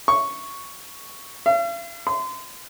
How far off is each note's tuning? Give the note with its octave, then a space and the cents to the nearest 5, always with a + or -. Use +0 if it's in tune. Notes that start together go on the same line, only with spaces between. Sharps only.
C#6 +0
F5 -45
C6 -30